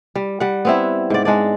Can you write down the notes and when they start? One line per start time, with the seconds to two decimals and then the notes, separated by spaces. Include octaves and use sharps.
0.15 G3
0.40 G3 F#5
0.65 B3 C4 E4
1.10 G#2 D5
1.25 G#3 D4 D5